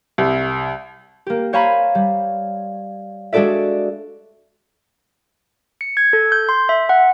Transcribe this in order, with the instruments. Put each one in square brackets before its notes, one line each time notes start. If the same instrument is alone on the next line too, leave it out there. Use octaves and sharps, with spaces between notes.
[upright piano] C2
[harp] A#3 G4
C5 C#5 F5 G#5 A#5 B5
G3
G#3 D4 F#4 A4 D5 E5
[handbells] C#7
G#6
A4
G6
C6
E5
F#5